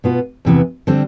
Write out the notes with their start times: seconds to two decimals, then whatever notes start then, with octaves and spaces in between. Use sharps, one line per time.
0.04 B2 B3 F4
0.45 E2 C3 E3 B3
0.87 D3 G3 C4